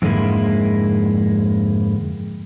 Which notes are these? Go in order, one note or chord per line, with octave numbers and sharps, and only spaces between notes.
F2 G#2 D3 G#3 A#3 E4